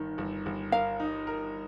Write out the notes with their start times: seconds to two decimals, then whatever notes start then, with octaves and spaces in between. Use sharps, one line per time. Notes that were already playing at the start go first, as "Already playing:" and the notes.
Already playing: G1 D#3
0.18 G1
0.46 G1
0.72 A#4 F5
1.00 D#4
1.27 A#4